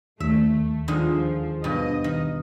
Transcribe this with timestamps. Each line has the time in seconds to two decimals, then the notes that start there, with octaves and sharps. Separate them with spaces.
0.20 D#2 A3 E5
0.88 D3 D#3 F3 G#3
1.64 G2 B2 F3 D#5
2.04 D#3